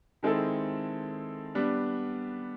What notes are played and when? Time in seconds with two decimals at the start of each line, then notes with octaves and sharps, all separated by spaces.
0.23 D#3 G#3 C4 E4 A4
1.55 G3 B3 D4